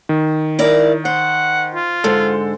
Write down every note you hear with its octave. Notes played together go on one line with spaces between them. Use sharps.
D#3
E4 A#4 D5
C5 F#5
F4
G#2 D3 G#3 A4 C5